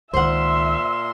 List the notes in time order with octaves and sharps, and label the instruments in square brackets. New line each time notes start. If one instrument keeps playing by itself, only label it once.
[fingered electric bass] C#2 D#3 [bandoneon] A#2 C6 [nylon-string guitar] C5 F#5 [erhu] E5